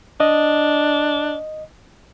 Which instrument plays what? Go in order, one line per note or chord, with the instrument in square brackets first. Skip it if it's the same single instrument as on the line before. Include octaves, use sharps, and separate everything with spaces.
[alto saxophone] D4 [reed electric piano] D#5